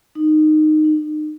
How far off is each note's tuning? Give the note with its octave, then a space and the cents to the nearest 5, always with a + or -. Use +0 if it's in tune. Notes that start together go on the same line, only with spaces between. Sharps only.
D#4 -15
D#4 -35